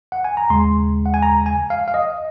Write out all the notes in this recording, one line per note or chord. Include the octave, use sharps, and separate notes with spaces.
F#5
G#5
A#5
D#2 C#3 G#3 C6
F#5
G#5
A#5
G#5
F5
F5
D#5